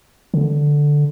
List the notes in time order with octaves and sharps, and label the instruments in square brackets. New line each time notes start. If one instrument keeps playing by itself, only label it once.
[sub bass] D3